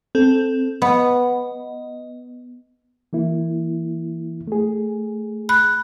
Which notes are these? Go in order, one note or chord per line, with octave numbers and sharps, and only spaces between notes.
C4 A4
B3 D#5
E3 A#3 E4
A3 G#4
B5 F#6